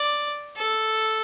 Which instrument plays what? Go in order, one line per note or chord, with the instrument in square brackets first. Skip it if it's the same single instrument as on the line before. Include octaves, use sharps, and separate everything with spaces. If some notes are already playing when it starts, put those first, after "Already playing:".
Already playing: [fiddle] D5
A4